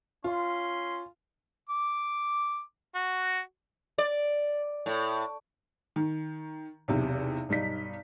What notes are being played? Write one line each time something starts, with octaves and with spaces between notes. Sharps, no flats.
C#4 F4 C6
D6
F#4
D5
A2
D#3
B1 E2 C3
B1 G2 D#4 B6